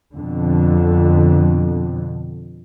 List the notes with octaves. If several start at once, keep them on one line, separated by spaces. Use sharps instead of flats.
F2 B2 D3